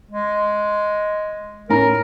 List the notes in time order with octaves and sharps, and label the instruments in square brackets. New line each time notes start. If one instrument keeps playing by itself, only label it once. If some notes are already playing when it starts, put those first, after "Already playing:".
[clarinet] G#3
[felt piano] A2 C#4 A#5 [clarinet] A#4